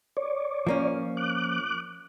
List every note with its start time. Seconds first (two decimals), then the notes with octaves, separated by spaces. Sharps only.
0.17 C#5 D5
0.67 F3 A#3 C#4
1.17 D6 F#6